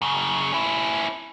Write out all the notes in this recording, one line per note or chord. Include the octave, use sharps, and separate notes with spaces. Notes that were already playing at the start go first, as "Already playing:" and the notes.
F#2 C#3
C#4 E4